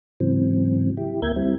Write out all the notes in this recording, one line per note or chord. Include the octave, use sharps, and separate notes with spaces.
G#2 C#3 E3 F#3 C4
E4 G4
D2 A#3 A#4 E5 G6 G#6
G3 C4 E4